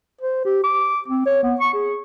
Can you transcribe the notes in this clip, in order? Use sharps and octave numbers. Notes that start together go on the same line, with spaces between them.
C5
G4
D6
C4
C#5
B3
C#6
G#4